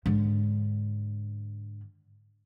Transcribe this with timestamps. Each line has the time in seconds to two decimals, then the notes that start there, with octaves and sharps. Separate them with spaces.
0.06 G#2 D3